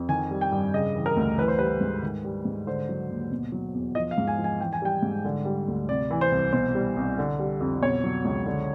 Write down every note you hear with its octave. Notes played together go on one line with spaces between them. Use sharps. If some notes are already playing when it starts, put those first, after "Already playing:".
Already playing: F2
D#3 G#5
G3
G5
G2
C#3 D#5
E3
A#4
D2
E3 B4
C5
G3 B4
G#2
D#3
G3
G#2
D3 C5
F#3
D#2
B2
F#3
E2
F3 D#5
F5
G#2
G#5
F3
G#5
E3 G5
G#5
G3 G5
G#2
D3
G3
D2
C3 D5
E3
C5
C2
B2 C5
G3
C2
D3
G3
F2
B2 C#5
F#3
C#2
D3